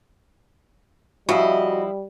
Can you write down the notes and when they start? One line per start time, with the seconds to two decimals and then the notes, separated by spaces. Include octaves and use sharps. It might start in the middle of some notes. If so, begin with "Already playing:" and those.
1.29 C#3 F3 G3 E4 F#4 D#5